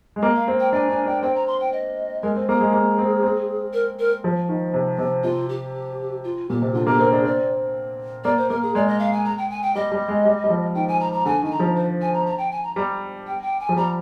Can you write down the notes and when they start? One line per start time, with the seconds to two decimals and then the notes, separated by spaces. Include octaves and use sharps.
0.16 G#3
0.22 A#3 D#5
0.35 F5
0.48 C4
0.60 G5
0.73 D4 G#5
0.89 D4 G#5
1.06 D4 G5
1.23 C4 G5
1.35 A#5
1.47 C6
1.60 G5
1.72 D#5
2.22 G#3 A#4
2.36 C4
2.49 A#3 G#4
2.61 G#3
2.74 A#3
2.98 C4
3.23 C4
3.73 A#4
3.99 A#4
4.24 F3
4.49 D#3
4.74 C3
4.99 C3
5.23 C3 F4
5.49 G4
6.24 F4
6.50 A#2 G4
6.62 C3
6.74 D3 F4
6.87 A#3 G4
6.99 C4 A#4
7.12 D4 G#4
7.24 C4 D5
8.24 A#3 D5
8.37 C5
8.50 A#3 A#4
8.63 G#4
8.75 G#3 D5
8.88 D#5
8.99 F5
9.12 G#5
9.25 A#5
9.38 G5
9.50 G#5
9.62 G5
9.75 G3 D#5
9.92 G3
10.08 G#3
10.25 G3
10.44 G3
10.50 F3
10.75 D#3 G5
10.88 G#5
11.00 A#5
11.12 A#5
11.26 D3 G#5
11.42 D#3
11.45 G#5
11.51 A#5
11.60 F3
11.76 C5
12.01 G#5
12.14 A#5
12.26 A#5
12.38 G5
12.51 G#5
12.63 A#5
12.76 G3 A#5
13.27 G5
13.43 G5
13.60 G#5
13.69 F3
13.76 G3 A#5